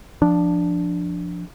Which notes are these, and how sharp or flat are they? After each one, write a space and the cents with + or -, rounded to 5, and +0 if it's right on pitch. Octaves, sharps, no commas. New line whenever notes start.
F3 +0 D4 +0